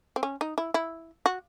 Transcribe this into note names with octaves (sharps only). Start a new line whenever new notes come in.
C4
C#4
D#4
E4
E4
F#4